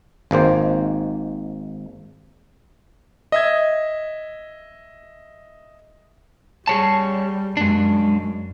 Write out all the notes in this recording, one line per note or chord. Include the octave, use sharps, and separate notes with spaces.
G#1 G#2 A#3 C5
D#5 E5 G#6
G3 G#4 C#5 A5
F#2 G#3 D4